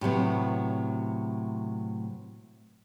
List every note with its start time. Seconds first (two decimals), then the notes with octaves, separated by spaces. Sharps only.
0.01 A2 C3 F#3 B3